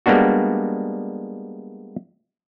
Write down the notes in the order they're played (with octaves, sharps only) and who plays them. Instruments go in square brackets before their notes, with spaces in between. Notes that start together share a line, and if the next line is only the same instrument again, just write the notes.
[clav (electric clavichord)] G3 G#3 A#3 B3 D4 F#4